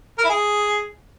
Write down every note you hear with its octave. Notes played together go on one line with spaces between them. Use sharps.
A#4
E4
G#4